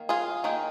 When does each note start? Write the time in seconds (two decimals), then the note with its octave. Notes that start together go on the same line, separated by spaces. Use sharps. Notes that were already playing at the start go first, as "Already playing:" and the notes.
Already playing: D#3 A#3
0.09 F4 G#4
0.44 D#3 A#3 D#4